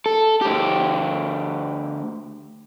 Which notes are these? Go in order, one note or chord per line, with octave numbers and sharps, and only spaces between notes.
A4
D2 G4